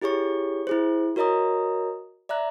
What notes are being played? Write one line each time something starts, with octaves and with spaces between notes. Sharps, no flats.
E4 G4 G#4 C#5 C#6
E4 G#4 C5
F#4 A#4 C#5 D#5 A#5 D#6
D5 E5 A#5 F#6